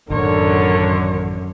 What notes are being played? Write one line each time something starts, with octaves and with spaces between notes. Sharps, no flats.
A1 F#2 D3 D#3 A#4 C#5